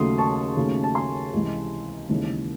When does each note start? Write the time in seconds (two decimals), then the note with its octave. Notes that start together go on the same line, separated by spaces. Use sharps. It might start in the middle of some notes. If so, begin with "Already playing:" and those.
Already playing: D#2 C#3 F#3 A3 C6 D#6
0.18 A5 C#6
0.57 D#2 C#3 F#3 A3
0.83 A5
0.95 G#5 C6
1.33 C#2 C3 E3 G#3
2.09 D#2 C#3 E3 G#3